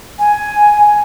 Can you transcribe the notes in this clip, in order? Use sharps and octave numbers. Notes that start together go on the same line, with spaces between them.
G#5